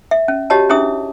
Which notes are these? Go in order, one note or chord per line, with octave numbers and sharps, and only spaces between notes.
E5
C#4
F#4 G4 C#5 D#5 A5
C#4 D4 E4 G#4 E5 D#6